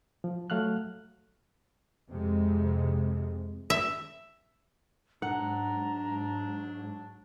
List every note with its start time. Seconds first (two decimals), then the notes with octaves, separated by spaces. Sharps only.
0.24 F3
0.50 F#3 A3 F5 F6 F#6
2.09 F2 C3 G#3
3.70 E5
5.22 G#2 F#3 D4 F#5 A#5